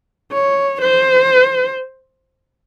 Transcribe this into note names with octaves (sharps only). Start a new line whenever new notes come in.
C#5
C5